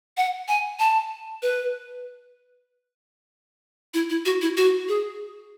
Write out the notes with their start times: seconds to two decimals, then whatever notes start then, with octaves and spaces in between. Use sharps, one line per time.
0.17 F#5
0.48 G#5
0.79 A5
1.42 B4
3.94 E4
4.10 E4
4.25 F#4
4.42 E4
4.57 F#4
4.88 G#4